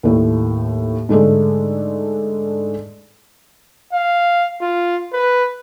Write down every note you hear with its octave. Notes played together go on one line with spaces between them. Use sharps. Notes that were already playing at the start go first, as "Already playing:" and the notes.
D#2 A2
G#2 D3 G#3 A3
F5
F4
B4